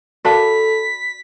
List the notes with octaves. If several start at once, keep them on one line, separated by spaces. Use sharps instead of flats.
F#4 A4 A#4 D5 F5 A5 B5 B6